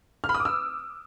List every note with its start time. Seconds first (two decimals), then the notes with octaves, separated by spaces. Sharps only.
0.24 F6
0.29 B5
0.34 D#6
0.40 D6
0.45 E6